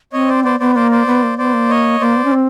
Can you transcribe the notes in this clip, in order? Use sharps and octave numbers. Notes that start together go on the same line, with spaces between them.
C4 C#5 D#5
C5 D5
B3 C5 D5
B3 C5 D5
A#3 C5 D5
C5 D5
B3
A#3
B3 C5 D5
A#3
C#5 D#5
A#3 C5 D5
B3
C#4
C4